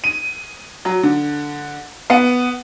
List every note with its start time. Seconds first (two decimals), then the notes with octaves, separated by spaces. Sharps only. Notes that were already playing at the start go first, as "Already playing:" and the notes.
0.04 D#7
0.85 F#3
1.03 D3
2.10 B3